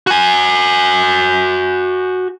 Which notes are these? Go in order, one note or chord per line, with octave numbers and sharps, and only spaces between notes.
F#4 G#5